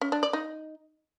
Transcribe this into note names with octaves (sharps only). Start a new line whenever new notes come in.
C#4
D4
D5
D#4